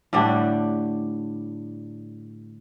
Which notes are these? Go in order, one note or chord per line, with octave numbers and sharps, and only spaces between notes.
A2 D3 G3 D4